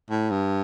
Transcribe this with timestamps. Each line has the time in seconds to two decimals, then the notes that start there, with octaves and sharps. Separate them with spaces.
0.11 A2
0.30 G2